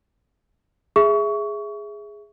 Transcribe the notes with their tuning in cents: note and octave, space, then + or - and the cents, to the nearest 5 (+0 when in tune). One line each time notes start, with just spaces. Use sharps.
G#4 +0 E5 +0 C#6 +25